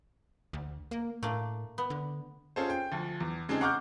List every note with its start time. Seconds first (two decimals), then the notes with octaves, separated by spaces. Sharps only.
0.53 D2
0.91 A#3
1.23 A2 A3 A#3 D4
1.78 B3
1.90 D3
2.56 C#4 F4 G#4 A4 C5
2.70 G5
2.92 D2 F3
3.20 E2
3.49 C#3 G#3 C4 D4 D#4 G#4
3.61 F#5 A#5 C#6 D6 F6 G6